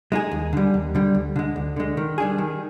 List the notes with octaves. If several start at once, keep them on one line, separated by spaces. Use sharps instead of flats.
G#3 D#4 G#4
D#2
D3 G3
D#2
D3 G3
D2
D3 G#3
D2
D3 G#3
D#3
G3 D4 G#4
D#3